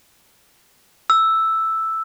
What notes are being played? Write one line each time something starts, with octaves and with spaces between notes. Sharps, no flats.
E6